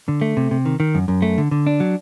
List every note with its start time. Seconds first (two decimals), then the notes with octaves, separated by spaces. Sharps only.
0.08 D3
0.21 A3
0.37 C3
0.51 C3
0.66 D#3
0.80 D#3
0.95 F#2
1.08 F#2
1.22 A3
1.38 D3
1.51 D3
1.67 D4
1.80 F#3